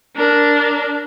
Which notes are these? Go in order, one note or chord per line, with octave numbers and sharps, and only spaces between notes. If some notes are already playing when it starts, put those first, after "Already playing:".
D4 A#4